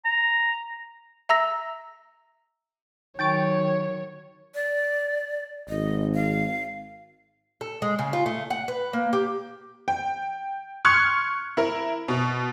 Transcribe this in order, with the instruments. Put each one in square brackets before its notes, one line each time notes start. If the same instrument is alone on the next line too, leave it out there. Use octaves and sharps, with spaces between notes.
[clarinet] A#5
[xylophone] E5 A#5 E6 A#6
[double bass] D#3 F#3 [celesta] D#4 C#6 [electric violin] C#5 [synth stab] G5 A6 D7
[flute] D5
[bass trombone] G#1 [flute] D#5
[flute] F5
[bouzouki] A4
G#3
C#3
F4
A3
F#5
B4
A#3
G4
[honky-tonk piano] G5
C6 C#6 F6 F#6 G#6 C#7
E4 A#4
B2